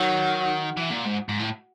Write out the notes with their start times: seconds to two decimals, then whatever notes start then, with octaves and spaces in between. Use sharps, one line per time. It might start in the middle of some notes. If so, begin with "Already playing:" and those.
Already playing: D#3 F#3
0.77 E3
0.90 A#2
1.05 G#2
1.29 G#2
1.39 A2